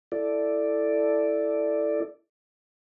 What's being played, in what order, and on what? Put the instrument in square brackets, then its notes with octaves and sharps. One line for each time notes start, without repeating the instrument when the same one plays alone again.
[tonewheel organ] E4 A4 D5